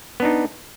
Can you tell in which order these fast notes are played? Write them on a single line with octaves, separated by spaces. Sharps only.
B3 D4 D#4